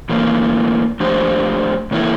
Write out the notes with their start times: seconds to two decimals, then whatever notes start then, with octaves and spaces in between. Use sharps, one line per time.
0.09 A2 E3 A#3
1.00 F3 A3 D4 G4 C5
1.91 A2 E3 A#3 E4 A4